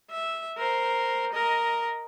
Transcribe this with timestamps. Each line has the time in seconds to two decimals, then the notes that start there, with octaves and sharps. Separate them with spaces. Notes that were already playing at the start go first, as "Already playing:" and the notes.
0.10 E5
0.58 A#4 C5
1.33 A#4 D#5